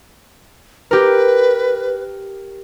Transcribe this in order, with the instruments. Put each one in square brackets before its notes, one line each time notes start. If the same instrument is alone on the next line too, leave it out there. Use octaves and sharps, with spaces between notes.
[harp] G4 A#4 [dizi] B4